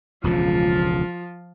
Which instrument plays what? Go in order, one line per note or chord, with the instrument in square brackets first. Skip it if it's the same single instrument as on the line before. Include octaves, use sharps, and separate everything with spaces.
[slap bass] E1 C#2 C#3 [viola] F3 F4